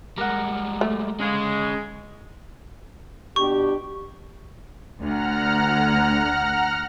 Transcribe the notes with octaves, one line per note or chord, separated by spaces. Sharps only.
G3 G#3 A#4 F#5
A3
G#3 C#4 F5
B2 D4 G4 C#6
D2 F#5 A#5 F6